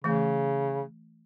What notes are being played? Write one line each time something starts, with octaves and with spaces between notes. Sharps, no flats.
C#3 E3 A3